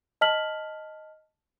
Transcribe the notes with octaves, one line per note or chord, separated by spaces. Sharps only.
D#5 A5 F6 B6 F#7